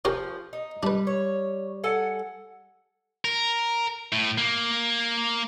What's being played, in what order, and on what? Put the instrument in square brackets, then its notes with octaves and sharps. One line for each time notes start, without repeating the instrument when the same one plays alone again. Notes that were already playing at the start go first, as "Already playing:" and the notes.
[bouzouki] F3 [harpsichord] C#4 G4 A#4
[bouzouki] D#4
[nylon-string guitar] G3 [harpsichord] D4 B4
[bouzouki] C#5
A4 F#5 G#5
[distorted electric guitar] A#4
A2
A#3